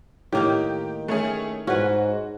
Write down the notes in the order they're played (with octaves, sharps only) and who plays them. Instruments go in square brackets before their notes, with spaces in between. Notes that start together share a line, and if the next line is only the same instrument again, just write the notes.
[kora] A2 A#3 D#4 [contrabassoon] D#3 [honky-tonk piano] G4
[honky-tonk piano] A3 C#4 G#4
[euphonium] G#2 [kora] C#4 B4 [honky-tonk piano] F#4